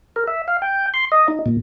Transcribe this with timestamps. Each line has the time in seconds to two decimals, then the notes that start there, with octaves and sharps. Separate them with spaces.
0.16 A#4
0.27 E5
0.48 F5
0.62 G5
0.94 C6
1.12 D#5
1.28 D#4
1.46 A#2